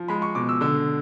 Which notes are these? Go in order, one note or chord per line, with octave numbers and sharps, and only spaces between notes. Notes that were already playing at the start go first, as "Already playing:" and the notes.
Already playing: F3
G#3 B5
C#6
B2 D6
E6
D3 E6